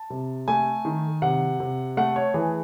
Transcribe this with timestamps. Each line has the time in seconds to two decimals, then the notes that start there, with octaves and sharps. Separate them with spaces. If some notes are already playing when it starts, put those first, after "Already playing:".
Already playing: A5
0.10 C3
0.48 A3 G#5
0.85 D#3
1.22 C3 F#5
1.60 C3
1.97 A3 F#5
2.16 C#5
2.34 E3 G#4